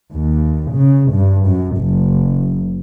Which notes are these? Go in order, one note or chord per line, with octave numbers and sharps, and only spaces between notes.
D#2
C#3
G2
F#2
F#1